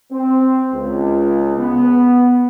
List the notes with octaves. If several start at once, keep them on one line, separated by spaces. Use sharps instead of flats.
C4
C#2
B3